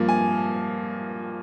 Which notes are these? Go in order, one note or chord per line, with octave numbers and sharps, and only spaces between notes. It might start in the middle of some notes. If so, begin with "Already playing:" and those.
Already playing: G2 F3 A#3
G#5